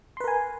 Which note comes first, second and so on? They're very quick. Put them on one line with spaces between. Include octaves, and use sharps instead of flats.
C6 B4 A#4 G#5